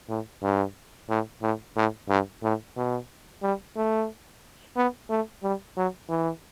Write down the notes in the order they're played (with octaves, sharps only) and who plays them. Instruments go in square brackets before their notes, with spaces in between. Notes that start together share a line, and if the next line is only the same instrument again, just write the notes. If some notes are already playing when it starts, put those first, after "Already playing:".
[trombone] A2
G2
A2
A2
A2
G2
A2
B2
G3
A3
B3
A3
G3
F#3
E3